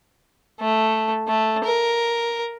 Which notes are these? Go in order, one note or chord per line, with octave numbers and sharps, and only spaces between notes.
A3
A3
A#4